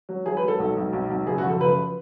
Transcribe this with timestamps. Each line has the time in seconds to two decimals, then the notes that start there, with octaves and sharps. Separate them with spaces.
0.09 F#3
0.26 F#3 G#4
0.37 B4
0.43 F#3
0.48 A4
0.59 B1
0.76 B1
0.93 B1
1.10 B1
1.27 F#1 G#4
1.38 F#4
1.44 F3
1.49 A4
1.61 F#1 B4